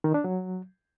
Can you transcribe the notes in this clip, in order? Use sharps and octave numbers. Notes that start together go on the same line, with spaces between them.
D#3
D4
F#3